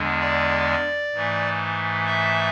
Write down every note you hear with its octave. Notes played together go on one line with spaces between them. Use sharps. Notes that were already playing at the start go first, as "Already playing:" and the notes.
Already playing: E2 D3 G#3 D4
D5
G#2 E3 A3
E5